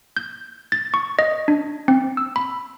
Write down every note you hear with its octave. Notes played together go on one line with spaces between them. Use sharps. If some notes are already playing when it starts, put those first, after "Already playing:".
G6
A6
C#6
D#5
D4
C4
E6
B5